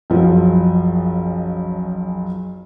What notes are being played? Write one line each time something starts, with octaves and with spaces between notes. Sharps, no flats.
F#1 B1 F3